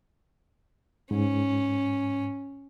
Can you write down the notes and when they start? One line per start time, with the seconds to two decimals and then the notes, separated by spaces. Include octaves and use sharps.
1.11 G#2 C#4